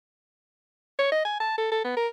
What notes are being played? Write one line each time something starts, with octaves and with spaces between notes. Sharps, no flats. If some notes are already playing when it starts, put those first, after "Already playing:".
C#5
D#5
G#5
A5
A4
A4
B3
A#4